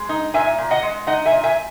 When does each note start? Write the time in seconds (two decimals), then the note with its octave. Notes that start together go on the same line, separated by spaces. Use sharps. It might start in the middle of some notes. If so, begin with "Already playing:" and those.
Already playing: G#3
0.09 D#4
0.34 A#2 E5 G#5
0.58 A#2
0.71 D#5 F#5
0.82 G#3
1.07 D#4 D#5 F#5
1.25 E5 G#5
1.31 A#2
1.44 E5 G#5